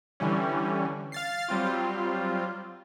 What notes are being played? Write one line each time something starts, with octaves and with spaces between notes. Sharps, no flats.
D3 E3 G3 C#4
F5 A6 C7
F#3 G3 C4 F4